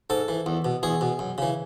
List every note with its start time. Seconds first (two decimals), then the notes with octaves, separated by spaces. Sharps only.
0.10 G#2 A4
0.28 E3
0.46 E2
0.65 B2
0.83 E2 G#4
1.01 B2
1.19 F#2
1.38 C#3 E3